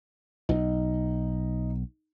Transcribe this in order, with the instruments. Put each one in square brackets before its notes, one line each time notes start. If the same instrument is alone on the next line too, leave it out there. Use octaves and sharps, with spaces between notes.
[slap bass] B1 [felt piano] D#4